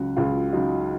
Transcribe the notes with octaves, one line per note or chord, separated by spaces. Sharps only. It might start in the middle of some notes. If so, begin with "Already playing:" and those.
Already playing: C#2 C#3 F#3 F#4
C#2 F4
C#3 F#3 D#4